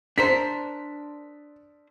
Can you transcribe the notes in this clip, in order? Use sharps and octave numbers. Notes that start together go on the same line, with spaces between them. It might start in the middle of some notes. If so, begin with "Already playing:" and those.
D4 A#4 C5 B6